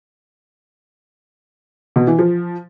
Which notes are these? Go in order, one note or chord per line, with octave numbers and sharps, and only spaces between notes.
B2
E3
F3